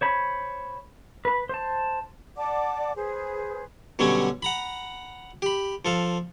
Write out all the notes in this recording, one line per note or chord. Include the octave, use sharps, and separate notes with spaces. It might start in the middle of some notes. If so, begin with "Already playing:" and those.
C5 C#5 B5
B4 B5
C5 A5
D5 F#5 A5 D6
G#4 B4 C5
B2 D3 F#3 G3 C#4
F#5 A#5 B5
G4 B5
F3 A4 F5